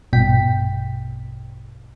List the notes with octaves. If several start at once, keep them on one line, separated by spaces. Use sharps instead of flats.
A#1 G2 B2 G5 B6